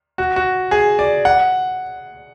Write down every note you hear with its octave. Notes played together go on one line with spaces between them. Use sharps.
F#4
F#4
G#4
D5
F#5